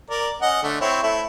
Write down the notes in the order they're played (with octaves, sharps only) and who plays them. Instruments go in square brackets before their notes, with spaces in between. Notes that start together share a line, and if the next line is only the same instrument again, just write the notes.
[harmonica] A#4 D5
C#4 D#5 F#5
D3 A3
C4 E4 C#5
A3 E4